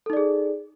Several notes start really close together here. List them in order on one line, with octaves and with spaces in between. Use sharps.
A4 D#4 D5 G#4